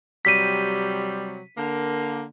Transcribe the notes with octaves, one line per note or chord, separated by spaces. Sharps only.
C3 F#3 G3 B6 D#7
D3 A#3